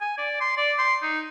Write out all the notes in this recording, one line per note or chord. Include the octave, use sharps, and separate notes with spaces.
G#5
D5
C6
D5
C6
D#4